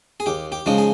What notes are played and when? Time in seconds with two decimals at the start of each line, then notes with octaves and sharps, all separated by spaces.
0.20 G#4
0.26 D#2 G4
0.52 G4
0.66 C#3 F3 G#3 D#4
0.78 G#4